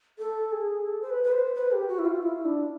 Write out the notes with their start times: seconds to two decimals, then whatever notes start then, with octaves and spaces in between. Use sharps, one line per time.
0.19 A4
0.52 G#4
0.86 A4
1.02 C5
1.10 B4
1.24 B4
1.32 C5
1.55 B4
1.72 G4
1.88 F#4
1.99 E4
2.05 F4
2.23 E4
2.45 D4